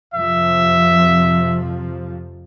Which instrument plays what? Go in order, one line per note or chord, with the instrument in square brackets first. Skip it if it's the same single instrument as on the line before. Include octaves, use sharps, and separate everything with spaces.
[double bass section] F2 C3 F3 [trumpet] E5